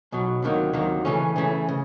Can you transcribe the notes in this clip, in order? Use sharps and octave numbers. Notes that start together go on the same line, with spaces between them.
B1 B2 F#3
D2 C3 D#3 F#3 A#3
D2 C3 D#3 F#3 A#3
C#3 E3 A3 C#4
C#3 E3 A3 C#4
C#3